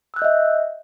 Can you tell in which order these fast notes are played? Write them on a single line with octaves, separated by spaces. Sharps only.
E6 F#6 G6 D#5 E5